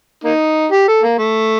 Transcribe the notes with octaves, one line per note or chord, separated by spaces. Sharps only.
A#3 D#4
G4
A4
A#3
A3